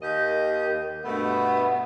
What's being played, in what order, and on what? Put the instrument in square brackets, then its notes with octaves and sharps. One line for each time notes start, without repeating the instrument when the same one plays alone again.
[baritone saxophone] D#2 [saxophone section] G4 D#5
[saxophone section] G2 B2 A3 [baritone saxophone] B3